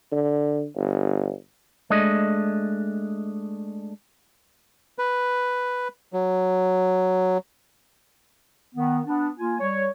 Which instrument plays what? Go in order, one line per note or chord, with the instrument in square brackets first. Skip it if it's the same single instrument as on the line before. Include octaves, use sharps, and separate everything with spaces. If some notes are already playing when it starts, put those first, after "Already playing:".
[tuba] D3
G1
[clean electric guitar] G#3 A3 D4 D#5
[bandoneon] B4
F#3
[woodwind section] D#3 B3
B3 D4
A#3 F4 G#5
G3 C#5